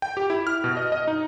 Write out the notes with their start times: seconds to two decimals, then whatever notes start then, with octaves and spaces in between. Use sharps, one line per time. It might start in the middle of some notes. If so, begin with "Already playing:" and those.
0.02 G5
0.17 G4
0.30 E4
0.47 F6
0.64 B2
0.77 D#5
0.92 D#5
1.08 D#4